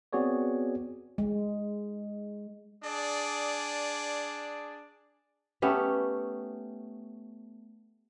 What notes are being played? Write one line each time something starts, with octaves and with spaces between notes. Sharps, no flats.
B3 C4 F#4 G#4 C#5 D5
G#3
D4 G#4 D5
A3 B3 C#4 G4